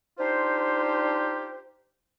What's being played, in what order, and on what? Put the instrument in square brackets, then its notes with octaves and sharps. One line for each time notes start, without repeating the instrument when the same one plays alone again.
[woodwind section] D4 D#4 F4 G4 C5